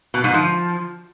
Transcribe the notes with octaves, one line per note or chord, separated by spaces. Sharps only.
B2
G#2
F3